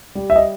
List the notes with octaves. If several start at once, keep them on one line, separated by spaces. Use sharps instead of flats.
G3
E5
D#5